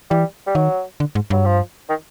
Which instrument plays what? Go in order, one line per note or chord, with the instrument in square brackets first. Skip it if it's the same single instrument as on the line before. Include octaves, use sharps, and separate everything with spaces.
[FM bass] E3 [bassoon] G3
[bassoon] G3
[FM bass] D#3 [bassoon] F#3
[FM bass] D3
G#2
[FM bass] G2 [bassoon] F#3
[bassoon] F3
D#3